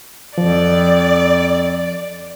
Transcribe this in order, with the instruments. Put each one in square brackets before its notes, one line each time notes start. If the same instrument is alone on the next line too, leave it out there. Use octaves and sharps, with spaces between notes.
[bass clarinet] F2 [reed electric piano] F3 [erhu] D5